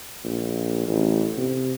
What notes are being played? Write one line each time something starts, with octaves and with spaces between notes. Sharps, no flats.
A#1
A1
C3